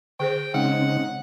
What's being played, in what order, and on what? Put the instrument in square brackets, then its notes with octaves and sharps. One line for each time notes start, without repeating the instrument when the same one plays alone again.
[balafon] D3 G#4 C5 [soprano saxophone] G5
[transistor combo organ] C#3 C4 D#4 [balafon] G#3 [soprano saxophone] F#5